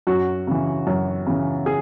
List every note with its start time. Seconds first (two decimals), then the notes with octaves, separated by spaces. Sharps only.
0.07 F#2 F#4
0.47 C#3 E3
0.87 F#2
1.27 C#3 E3
1.66 G#4